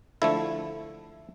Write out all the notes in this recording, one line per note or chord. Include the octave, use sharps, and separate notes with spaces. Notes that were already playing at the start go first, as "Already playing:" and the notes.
D3 F3 A3 E4